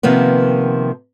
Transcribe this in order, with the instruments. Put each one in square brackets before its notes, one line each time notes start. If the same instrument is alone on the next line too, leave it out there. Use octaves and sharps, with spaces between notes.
[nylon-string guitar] C3 D#3 F3 A#3 B3